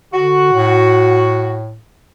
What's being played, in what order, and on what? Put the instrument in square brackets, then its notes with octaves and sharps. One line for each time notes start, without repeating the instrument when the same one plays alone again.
[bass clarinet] D3 [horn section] F#4
[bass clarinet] A2